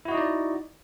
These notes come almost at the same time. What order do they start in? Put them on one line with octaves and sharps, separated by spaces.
E4 F#4 D#5 D#4 D5